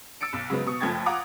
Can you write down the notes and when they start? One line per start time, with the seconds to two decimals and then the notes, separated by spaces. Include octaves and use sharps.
0.21 E6 A6 C#7 D7
0.33 B1 E6
0.50 C#3 F#3 G#3 B3
0.66 B2 C#6 D#6 C#7
0.80 F#1 F3 A3 G5 G#6 A6
1.06 F4 F#5 A#5 D6 D#6